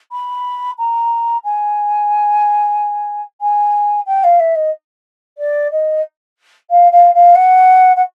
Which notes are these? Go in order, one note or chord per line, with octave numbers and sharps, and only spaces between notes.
B5
A#5
G#5
G#5
G5
F5
E5
D#5
D5
D#5
F5
F5
F5
F#5
F#5